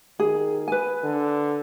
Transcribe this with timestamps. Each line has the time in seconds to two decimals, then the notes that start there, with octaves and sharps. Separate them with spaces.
0.20 D#3 G#4
0.68 B4 G#5
1.04 D3